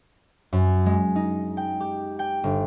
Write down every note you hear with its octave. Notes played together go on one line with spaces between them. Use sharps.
F#2
G#3
D#4
G5
G4
G5
G1